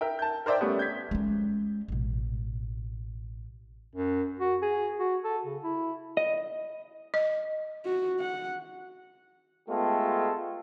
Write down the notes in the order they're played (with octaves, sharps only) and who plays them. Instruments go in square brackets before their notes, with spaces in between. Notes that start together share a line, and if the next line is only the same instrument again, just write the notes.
[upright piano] A#4 E5 G5
A5 G6
A#4 C5 D5 E5 G5
G3 A3 B3 C#4
G6 G#6 B6
[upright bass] G#3 C#4
A1 B2
[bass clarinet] F#2
F#4
G#4
F#4
A4
C#3
E4
[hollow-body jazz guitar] D#5
[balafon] D#5
[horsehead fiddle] F#4
F#5
[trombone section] G#3 A3 B3 F4 G4 A4